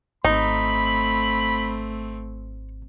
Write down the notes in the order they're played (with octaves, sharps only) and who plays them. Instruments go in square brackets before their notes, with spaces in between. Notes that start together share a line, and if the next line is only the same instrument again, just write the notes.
[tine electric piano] G#1 [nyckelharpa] A3 C4 [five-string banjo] D#4 [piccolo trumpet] B5